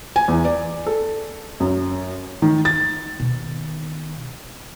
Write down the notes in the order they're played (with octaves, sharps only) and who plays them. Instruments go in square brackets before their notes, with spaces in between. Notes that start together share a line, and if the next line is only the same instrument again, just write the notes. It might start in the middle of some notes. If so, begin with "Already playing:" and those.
[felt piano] G#5
E2
D5
A4
F#2
D#3
A6
[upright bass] B2 D#3